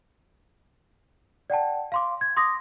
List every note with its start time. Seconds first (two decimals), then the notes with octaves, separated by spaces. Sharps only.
1.50 D5 F#5 G5 A5
1.92 F5 C6 D6
2.21 G#6
2.37 C6 D6 D#6 A#6